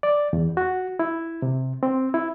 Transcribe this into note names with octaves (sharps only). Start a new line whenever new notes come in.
D5
E2
F#4
E4
C3
C4
E4